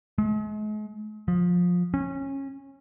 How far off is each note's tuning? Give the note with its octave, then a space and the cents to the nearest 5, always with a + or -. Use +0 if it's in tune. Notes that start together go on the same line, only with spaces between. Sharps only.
G#3 +40
F3 +20
C#4 -20